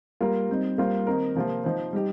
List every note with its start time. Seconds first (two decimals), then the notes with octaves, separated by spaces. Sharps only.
0.21 G3 A#3 F4 A#4
0.50 G3 C4 D#4
0.78 G3 A#3 F4 C5
1.07 D#3 C4 D#4 A#4
1.35 C3 F3 A#3 F4
1.64 F3 D#4 C5
1.93 G3 D#4 G4